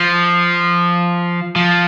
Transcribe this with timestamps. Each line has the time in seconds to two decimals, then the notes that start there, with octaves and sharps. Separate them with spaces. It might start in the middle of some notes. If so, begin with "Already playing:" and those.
Already playing: F3
1.56 F3